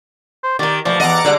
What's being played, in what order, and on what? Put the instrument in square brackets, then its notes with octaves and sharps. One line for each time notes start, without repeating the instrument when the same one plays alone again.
[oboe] C5
[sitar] D#3 [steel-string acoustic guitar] G4 A#4 [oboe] D5
[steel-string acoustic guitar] D2 E3 A#3 [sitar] F3 [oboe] D5
[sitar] E2 D#5 [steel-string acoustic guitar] A2 [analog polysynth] F#5 A#5 D6
[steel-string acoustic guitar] D#2 G3 G#3 [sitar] D3